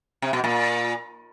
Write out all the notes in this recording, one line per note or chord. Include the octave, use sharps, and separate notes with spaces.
C3
B2
A#2